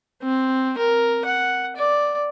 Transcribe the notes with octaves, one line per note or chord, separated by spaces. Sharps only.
C4
A#4
F#5
D5